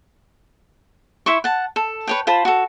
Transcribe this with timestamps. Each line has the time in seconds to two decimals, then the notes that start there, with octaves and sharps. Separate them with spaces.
1.26 E4 E5 C6 C#6
1.44 F#5 A5
1.76 A4
2.07 B4 C#5 G5
2.27 F4 C5 A5 B5
2.45 F#4 A4